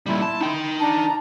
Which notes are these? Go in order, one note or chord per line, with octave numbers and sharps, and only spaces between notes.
A#2 G3 E4 C6
A5
D#4 G5
D4 A5 A#5